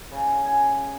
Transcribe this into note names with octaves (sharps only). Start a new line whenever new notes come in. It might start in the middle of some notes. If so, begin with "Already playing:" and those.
C#3
G#5